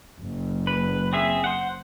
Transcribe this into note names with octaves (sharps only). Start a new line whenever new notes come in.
F#1
B4
C4 G#4 E5
C5 F#5